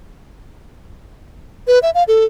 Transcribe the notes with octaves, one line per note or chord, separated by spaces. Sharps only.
B4
E5
F5
A4